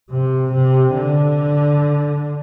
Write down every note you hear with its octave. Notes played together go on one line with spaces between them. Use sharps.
C3
C3
D3